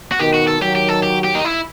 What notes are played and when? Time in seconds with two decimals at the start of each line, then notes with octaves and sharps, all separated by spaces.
0.12 F#4
0.19 B2 D#3 G4
0.34 F#4
0.48 A4
0.61 D#3 F#3 G4
0.75 G4
0.89 A4
1.03 G4
1.24 G4
1.35 D#4
1.45 E4